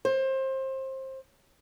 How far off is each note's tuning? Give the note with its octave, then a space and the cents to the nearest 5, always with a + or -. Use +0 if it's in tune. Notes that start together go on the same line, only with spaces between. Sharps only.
C5 +25